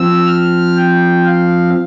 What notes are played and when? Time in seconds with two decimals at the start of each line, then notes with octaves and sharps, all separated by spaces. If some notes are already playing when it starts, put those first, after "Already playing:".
Already playing: F3 C4 E6
0.26 F6
0.76 G5
1.25 F5